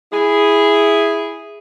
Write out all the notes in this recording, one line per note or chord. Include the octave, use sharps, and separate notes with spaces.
E4 G#4